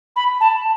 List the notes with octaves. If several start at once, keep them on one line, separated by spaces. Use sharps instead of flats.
B5
A5